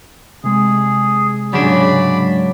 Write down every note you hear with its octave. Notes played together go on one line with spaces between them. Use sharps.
C3 G#3 G#4
G#2 C#3 F#3 D4 D5 B5